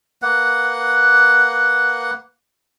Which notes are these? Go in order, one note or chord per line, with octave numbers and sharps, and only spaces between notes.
A#3 B4 F#5